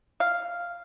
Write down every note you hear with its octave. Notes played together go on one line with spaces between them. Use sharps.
F5